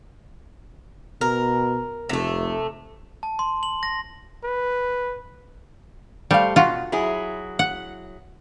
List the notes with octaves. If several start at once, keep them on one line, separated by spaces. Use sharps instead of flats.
B2 A#4
F1 C3 A3
A5
C6
F#7
A#6
B4
G3 A3 C5 F5
B2 F4 F#4
F#3 E4 G#4
F#5